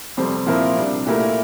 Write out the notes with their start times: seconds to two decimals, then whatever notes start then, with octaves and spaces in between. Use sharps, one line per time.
0.17 F2 C3 G3 C4
0.46 A#2 F3 C4 E4 A#4
0.76 C3 G3 D4
1.06 A#2 A3 E4 G4 A#4